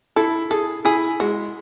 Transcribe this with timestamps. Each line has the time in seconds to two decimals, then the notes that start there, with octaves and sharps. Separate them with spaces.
0.16 E4 A4
0.51 G#4 A4
0.85 E4 G#4
1.20 G#3 F#4